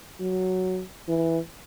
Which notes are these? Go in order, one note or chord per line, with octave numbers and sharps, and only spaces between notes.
F#3
E3